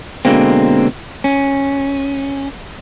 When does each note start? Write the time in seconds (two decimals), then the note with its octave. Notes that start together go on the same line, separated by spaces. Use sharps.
0.25 B2 D3 G#3 A#3 C4
1.24 C#4